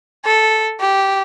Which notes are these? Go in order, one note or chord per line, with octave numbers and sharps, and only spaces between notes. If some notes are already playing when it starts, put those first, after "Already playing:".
A4
G4